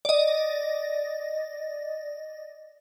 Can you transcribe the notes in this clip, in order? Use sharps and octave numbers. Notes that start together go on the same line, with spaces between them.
D5 D#5